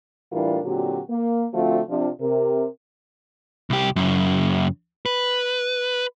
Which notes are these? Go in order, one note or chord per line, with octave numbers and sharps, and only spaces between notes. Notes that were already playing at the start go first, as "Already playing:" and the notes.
A2 E3 G3 D4 F4 A#4
A#2 D3 F#3 C4 F#4 G4
A#3
D3 F3 A3 C4 F4 F#4
C3 F3 D4
C3 A#4
C2 G4
F#2 C#3
B4